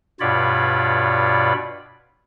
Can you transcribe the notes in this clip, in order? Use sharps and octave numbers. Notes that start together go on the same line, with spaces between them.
G2 B2 F4 C#5 D5 B5